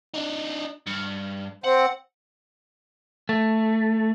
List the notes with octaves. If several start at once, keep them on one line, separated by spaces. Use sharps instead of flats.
D4 D#4
G2
C4 F#5
A3